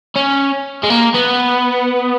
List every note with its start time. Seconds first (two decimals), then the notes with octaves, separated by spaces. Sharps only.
0.16 C#4
0.84 G#3
0.90 A#3
1.15 B3